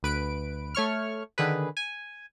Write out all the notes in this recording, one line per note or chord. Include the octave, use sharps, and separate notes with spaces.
D2 B4 D7
A3 C#5 C#6 F6
D3 D#3 G#4 B4
G#5